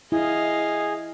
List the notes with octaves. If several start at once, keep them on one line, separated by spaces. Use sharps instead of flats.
E4 G#4 D#5 F5